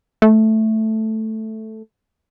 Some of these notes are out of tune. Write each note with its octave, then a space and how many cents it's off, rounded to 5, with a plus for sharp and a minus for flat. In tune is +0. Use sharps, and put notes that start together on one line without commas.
A3 +0